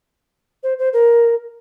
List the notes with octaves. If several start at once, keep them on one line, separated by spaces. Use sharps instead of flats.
C5
C5
A#4